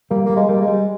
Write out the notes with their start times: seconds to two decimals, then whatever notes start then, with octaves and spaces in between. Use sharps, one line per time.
0.11 G3 A#3
0.25 G3 A#3
0.36 G#3
0.49 G3 A#3
0.62 G#3
0.68 G3